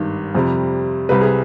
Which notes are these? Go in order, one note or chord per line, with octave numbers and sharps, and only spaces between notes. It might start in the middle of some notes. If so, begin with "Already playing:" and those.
Already playing: G#1 G2 D#3
F2 C3 G3
C2 C3 G3 B4
G#4